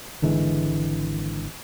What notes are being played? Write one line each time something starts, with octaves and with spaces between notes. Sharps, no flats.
G#1 D3 E3 G#3